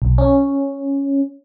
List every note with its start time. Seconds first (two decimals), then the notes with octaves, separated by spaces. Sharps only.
0.02 B1
0.18 C#4